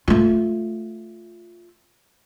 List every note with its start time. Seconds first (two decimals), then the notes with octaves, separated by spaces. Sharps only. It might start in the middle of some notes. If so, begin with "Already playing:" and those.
0.08 A3 F4